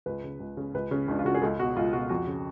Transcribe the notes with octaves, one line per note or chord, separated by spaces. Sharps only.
C#2 B4
C#3
C#2
C#3
C#2 B4
C#3
C#2 D4
F4
C#3 F#4
G#4
C#2 A4
B2 F#4
C#2 F4
B2 F#4
F2 F#4
C#3